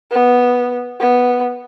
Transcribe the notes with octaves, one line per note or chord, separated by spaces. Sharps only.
B3
B3